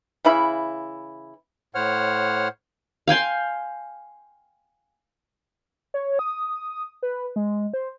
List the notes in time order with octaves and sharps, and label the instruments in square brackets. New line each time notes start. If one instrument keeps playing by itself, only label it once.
[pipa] C#3 E3 E4 B5
[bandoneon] A2 C5 C#5 F#5 F6
[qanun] F5 G5 G#5 C6
[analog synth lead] C#5
D#6
B4
G#3
C5